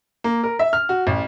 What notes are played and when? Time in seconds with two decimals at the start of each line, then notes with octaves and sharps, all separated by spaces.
0.24 A#3
0.43 A#4
0.59 E5
0.73 F6
0.89 F#4
1.07 A1